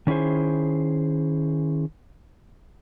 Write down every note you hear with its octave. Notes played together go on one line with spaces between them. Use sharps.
D#3 C#4 E4 G#4 C5